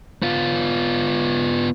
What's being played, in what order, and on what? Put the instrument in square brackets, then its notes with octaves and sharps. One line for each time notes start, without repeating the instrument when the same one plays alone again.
[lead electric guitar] B3 F4